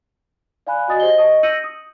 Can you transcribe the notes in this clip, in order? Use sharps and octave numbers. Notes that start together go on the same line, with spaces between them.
D5 F5 G#5 B5 F#6
F#4 D5 D#5 G#5 D#6 A6
G4 C5 D#5 G7
D#5 A5 C#6 D#6
E6 G6 A#6 C#7 D#7 F#7
D#6